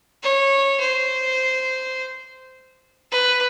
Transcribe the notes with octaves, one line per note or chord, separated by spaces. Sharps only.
C#5
C5
B4